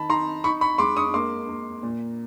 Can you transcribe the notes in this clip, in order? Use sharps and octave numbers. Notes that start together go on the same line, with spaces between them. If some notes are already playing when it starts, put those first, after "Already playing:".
Already playing: D#3 A5 B5
D#4 A#5 C6
D#4 B5 C#6
B5 C#6
G#3 C6 D6
C#6 D#6
A#3 C6 D6
A#3
A#2